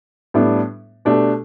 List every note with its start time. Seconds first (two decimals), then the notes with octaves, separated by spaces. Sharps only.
0.34 A2 G3 B3 D4
1.05 B2 A3 D4 G4